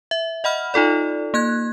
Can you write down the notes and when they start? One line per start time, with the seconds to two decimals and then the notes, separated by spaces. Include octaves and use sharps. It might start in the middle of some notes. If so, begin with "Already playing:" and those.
0.11 E5
0.44 D#5 F#5 B5 F6
0.74 D#4 F4 A4 D5
1.34 A#3 F#6 G#6